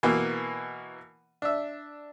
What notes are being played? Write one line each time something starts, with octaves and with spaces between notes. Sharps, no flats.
B2 E3 A#3
D4 E5